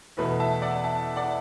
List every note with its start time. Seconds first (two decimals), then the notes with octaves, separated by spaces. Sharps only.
0.17 E2 B2 A3 B4
0.40 E5 A5
0.62 D5 F#5
0.84 E5 A5
1.16 D5 F#5